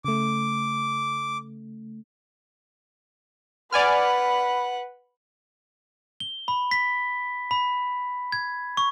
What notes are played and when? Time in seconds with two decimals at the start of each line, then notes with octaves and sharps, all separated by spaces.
0.05 C#3 A3 D6
3.72 B4 D5 F#5 G#5 B5 F6
6.20 G7
6.48 B5
6.71 B6
7.51 B5
8.32 G#6
8.77 C#6